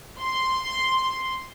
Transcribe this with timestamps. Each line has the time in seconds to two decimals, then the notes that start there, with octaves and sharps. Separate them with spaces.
0.19 C6